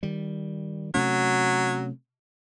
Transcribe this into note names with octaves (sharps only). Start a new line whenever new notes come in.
D#3 G3
C3 F#3 A3 C#4